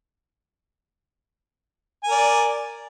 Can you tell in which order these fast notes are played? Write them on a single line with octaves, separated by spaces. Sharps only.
G#5 A#4 D5